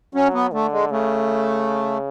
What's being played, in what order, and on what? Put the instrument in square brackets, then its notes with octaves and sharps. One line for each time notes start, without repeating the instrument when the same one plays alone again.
[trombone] F#3 [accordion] C#4
[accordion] B3
[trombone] D3 [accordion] A3
[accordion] G#3
[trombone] C#3 [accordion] A3